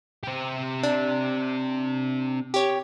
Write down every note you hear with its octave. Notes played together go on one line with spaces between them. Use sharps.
C4 G4
D4
G4 C#5